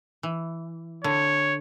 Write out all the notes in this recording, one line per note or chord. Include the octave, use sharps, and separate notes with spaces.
E3
D3 C#5